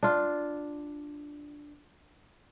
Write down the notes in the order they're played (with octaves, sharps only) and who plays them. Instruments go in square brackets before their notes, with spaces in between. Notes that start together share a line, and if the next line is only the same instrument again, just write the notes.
[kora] D4 F4